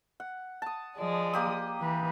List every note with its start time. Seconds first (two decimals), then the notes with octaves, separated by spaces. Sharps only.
0.20 F#5
0.62 A5 D#6
0.96 F3 G#3 D5
1.33 A#3 G4 D#6
1.80 E3 B4